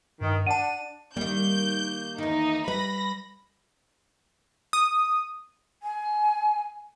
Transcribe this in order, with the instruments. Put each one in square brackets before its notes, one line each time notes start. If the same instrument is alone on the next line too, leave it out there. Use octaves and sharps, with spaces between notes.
[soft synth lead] G2 [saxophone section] D#3
[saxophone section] D4 D5 [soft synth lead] F#5 [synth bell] A5 D#7
[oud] D#3 G3 [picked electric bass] A#3 [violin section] G6
[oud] E2 D#3 [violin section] D#4
[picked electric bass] G3 [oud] B4 [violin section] B5 A#6
[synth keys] D#6
[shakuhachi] G#5